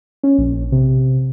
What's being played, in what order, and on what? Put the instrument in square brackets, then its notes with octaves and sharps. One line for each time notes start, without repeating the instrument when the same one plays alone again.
[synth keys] C#4
A#1
C3